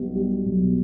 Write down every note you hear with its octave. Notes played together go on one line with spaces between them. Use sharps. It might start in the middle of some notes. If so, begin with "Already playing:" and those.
Already playing: B1 G3 B3
G3
B1